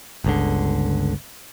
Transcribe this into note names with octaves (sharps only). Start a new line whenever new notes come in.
G1 C#2 D3